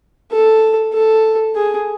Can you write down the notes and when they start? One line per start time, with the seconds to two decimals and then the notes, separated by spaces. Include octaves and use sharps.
0.32 A4
0.94 A4
1.55 G#4